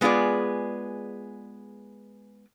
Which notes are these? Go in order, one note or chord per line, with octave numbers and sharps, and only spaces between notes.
G#3 B3 F4 G#4 D5